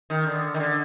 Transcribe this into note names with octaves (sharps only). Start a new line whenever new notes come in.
D#3
D3
D#3
D3